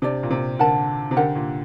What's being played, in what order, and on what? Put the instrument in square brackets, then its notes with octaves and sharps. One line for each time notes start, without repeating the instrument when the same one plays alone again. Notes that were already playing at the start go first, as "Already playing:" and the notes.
[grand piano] C3 [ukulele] D4 G4 D5
[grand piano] A#2
C3
[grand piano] D3 [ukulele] A#4 F#5 A5
[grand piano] C3
[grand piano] D3 [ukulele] G4 A#4 F#5
[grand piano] A#2